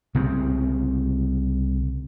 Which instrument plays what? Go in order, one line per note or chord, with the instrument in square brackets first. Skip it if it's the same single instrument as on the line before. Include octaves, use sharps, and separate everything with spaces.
[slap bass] C2 C#3 C4